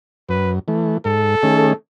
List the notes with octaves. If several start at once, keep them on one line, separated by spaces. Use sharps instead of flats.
F#2 B4
E3 A3
G#2 A4
D#3 A3 C#4 G#4